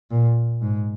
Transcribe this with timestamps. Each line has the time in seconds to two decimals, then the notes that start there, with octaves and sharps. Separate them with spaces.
0.11 A#2
0.61 G#2